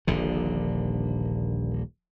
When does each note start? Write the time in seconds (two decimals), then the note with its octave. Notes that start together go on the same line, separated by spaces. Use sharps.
0.07 D#1 A#1 D3